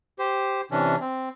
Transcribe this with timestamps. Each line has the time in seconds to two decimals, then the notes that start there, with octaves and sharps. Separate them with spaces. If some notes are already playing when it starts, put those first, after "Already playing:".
0.19 G4 C5
0.71 C3 E3 C#4 D4
1.00 C4